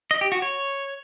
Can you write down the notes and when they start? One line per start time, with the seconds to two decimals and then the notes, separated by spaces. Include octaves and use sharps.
0.11 D#5
0.21 G4
0.32 F#4
0.42 C#5